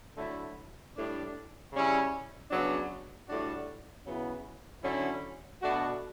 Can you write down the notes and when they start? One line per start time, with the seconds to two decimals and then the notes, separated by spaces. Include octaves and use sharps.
0.17 D3 F#3 A3 E4
0.95 A2 G3 D4
1.73 C#3 G3 C#4 E4
2.50 C#3 F#3 B3 D4
3.28 A2 G3 D4 F#4
4.05 C#3 F#3 B3 E4
4.83 D3 F#3 C#4 E4
5.61 B2 A3 D4 F#4